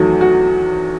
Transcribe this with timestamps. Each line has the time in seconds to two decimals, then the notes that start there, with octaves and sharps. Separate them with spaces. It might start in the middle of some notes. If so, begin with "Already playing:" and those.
Already playing: E2 D#3 F#3 A3 F#4
0.21 F#4